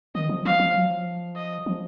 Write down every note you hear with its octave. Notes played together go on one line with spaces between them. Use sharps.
D#3 D#5
F3
F3 F5
F3
F#3
F3
D#5
F3